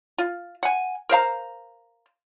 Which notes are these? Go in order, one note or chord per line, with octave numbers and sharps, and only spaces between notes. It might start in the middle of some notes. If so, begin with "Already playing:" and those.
F4
F#5 G#5
A#4 C5 F5 A#5